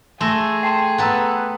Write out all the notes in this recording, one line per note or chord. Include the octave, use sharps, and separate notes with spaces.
A3 G#4 A5 C6 E6 A#6
G5 A5 C6 C7 E7
B3 A4 B4 F#5 A#5 E6